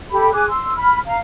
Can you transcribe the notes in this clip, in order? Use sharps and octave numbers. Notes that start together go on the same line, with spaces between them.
G4 A4 B5
G#4 G#5 D6 F#6
C6 E6
B5 F6
F5 A#5